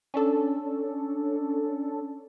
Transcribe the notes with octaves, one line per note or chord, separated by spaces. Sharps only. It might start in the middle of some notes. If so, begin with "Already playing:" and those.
C#4 D4 A4